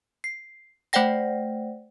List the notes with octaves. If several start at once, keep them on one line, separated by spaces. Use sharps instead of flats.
C7
A3 C5 D5 F#5 G5 A#6